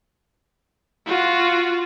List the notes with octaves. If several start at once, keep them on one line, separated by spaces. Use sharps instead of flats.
F4 F#4